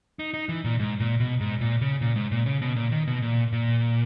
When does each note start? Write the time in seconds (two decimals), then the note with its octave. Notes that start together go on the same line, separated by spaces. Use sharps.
0.19 D#4
0.34 D#4
0.49 E3
0.64 A#2
0.79 G#2
1.00 A#2
1.20 B2
1.40 G#2
1.61 A#2
1.81 C#3
2.01 A#2
2.16 G#2
2.32 A#2
2.46 C#3
2.62 B2
2.76 A#2
2.92 D#3
3.07 B2
3.22 A#2
3.53 A#2